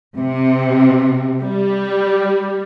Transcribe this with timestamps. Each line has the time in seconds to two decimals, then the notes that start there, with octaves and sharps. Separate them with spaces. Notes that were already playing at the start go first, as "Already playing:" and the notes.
0.17 C3
1.43 G3